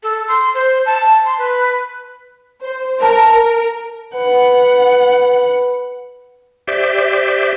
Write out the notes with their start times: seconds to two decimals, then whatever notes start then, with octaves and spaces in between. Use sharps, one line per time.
0.03 A4
0.28 C6
0.54 C5
0.86 A5
1.25 C6
1.38 B4
2.62 C5
3.01 A#4 B4 A5 A#5
4.15 B4 F#5
6.67 G4 C5 D5 E5